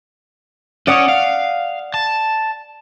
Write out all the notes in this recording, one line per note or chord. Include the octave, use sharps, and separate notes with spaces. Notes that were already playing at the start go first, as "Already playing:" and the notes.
C#4 C#5 D5 F#5 D#6
F5
A5